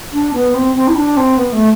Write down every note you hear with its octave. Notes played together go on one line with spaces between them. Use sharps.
D4
B3
C4
C4
E4
D4
C4
B3
A3